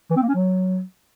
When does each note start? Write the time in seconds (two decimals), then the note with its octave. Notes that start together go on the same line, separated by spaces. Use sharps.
0.10 E3
0.16 C4
0.22 A#3
0.28 C#4
0.34 F#3